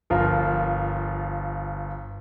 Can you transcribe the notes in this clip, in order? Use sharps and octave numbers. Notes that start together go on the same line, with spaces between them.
G1 F3 F4 A#4